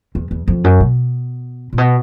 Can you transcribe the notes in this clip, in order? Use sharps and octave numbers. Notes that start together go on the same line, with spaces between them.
E2
E2
F2
F#2
B2
A#2
B2